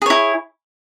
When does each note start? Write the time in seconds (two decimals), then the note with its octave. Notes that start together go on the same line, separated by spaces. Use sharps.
0.02 G#4
0.06 C#5
0.10 E4